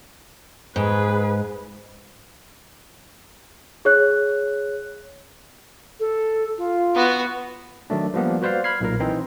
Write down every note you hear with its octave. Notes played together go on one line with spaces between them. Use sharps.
G#2 G#4 B4
G#4 C#5 F#6
A4
F4
B3 F#4
D#3 F#3 A3 D4
F3 G3 A#3 B3
F#4 B4 C5 D5 F5
B5 F6 G#6 C7
B1 A#2 A#4
E3 C4 D#4 C5